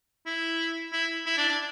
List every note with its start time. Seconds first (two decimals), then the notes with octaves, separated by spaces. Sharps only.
0.26 E4
0.93 E4
1.26 E4
1.37 D4
1.49 D4